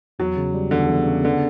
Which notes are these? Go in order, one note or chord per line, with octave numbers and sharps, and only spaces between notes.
E2 F#3
C#3
G3
E2 D3
E2
C#3
D3 B3